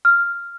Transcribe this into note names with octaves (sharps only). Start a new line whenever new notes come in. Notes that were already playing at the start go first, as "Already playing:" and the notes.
F6